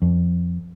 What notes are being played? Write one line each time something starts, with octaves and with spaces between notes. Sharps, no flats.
F2